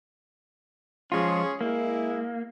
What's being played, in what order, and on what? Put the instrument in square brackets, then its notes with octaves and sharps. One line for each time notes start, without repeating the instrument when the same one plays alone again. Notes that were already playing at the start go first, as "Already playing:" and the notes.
[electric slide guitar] F3 G#3 F4 [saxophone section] C#4 G#4
[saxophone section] G#3 E4 [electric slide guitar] A#3